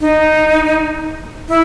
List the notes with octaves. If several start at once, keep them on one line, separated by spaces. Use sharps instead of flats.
D#4
E4